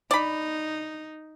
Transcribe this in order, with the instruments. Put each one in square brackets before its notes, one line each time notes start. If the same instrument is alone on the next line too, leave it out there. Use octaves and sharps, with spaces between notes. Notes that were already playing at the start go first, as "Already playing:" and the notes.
[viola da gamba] D#4 [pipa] D5 B5